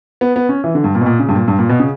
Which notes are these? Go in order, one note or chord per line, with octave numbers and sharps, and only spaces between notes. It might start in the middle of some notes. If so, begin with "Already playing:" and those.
B3
B3
C#4
E3
D3
G2
A#2
B2
A#2
C#3
G2
A#2
G2
A#2
B2
C#3